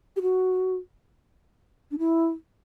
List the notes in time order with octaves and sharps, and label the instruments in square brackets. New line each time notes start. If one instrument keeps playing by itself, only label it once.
[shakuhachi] G4
F#4
D4
E4